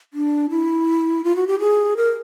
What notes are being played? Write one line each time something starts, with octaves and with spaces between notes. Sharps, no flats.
D4
E4
F4
F#4
G4
G#4
A#4